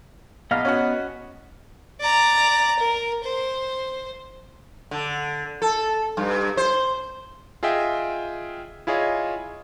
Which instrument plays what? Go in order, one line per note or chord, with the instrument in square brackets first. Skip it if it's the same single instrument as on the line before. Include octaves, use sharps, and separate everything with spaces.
[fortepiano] A#1 F5 [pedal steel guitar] B3 D#5 F6
[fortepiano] C#4 F#4 F#5
[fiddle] D5 A#5
A#4
C5
[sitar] D3
A4
G2
C5
[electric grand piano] F4 G#4 D#5 E5 G5
E4 F4 G#4 C#5 D#5